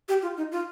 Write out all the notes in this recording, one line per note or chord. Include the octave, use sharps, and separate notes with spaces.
G4
F4
D#4
F4